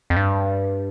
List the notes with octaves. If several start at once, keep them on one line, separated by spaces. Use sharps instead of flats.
F2
G2